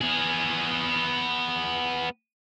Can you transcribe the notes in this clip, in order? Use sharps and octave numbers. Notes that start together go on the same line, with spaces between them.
B3 G#4